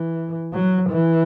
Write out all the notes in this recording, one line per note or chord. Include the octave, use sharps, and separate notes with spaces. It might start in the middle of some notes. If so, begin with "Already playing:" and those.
Already playing: E3
F#3
E3